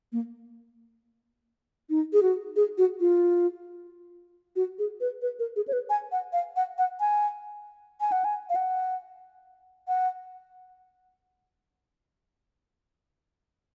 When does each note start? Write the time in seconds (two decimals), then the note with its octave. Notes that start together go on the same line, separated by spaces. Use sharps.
0.12 A#3
1.90 D#4
2.13 G#4
2.22 F#4
2.56 G#4
2.78 F#4
3.00 F4
4.56 F#4
4.79 G#4
5.01 B4
5.22 B4
5.39 A#4
5.56 G#4
5.68 C#5
5.73 B4
5.90 G#5
6.12 F#5
6.33 F5
6.56 F#5
6.78 F#5
7.00 G#5
8.01 G#5
8.12 F#5
8.24 G#5
8.50 F5
8.56 F#5
9.88 F#5